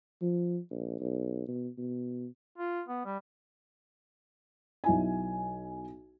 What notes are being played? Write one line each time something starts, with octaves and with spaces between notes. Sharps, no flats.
F3
A#1
B1
B2
B2
F4
B3
G3
B1 E4 G#5